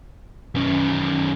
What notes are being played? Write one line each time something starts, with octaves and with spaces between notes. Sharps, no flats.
F#2 B2 D#3 E3 C#4